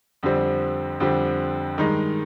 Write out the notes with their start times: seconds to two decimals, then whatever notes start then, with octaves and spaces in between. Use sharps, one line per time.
0.23 F2 D3 G3 C4
1.00 F2 D3 G3 C4
1.78 G2 D#3 G#3 D#4